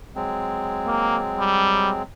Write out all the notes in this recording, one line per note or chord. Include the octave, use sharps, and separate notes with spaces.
F#3 G#3 C4
A#3
G3